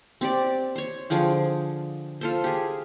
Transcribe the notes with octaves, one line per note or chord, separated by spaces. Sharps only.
C4 G4 D5
C5 C#5
D3 F3 G#4 G5
F4 A4 C5
G4 G#4